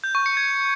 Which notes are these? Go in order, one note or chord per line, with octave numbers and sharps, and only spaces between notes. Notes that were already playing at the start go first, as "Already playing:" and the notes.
G6
C#6
C#7
G#6